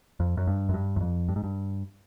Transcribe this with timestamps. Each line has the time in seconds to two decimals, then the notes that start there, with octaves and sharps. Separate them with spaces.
0.20 F2
0.37 F#2
0.47 G2
0.69 F#2
0.74 G2
0.96 E2
1.01 F2
1.29 G2
1.36 G#2
1.44 G2